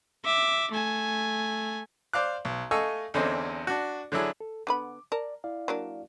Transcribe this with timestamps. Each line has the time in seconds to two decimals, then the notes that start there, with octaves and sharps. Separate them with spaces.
0.25 E5 D6
0.72 A3 G#5
2.13 C5 D5 F5 D6 F#6
2.45 B1
2.71 A3 D#5 F5 G#5 C#6 E6
3.14 E2 D3 C4 C#4 C5 D#5
3.67 D4 F#4
4.12 D3 F#3 D4 E4 G#4
4.41 A4
4.67 D3 B3 B5 D6
5.12 A#4 D5 A5
5.44 E4 D5 F5
5.68 F#3 A#3 D4